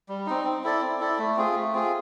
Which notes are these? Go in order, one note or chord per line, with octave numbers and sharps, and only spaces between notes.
G3
C4 D#4
C4
E4 A4 D5
C4
E4 A4 D5
A3
C4 F4 G#4
A3
C4 F4 G#4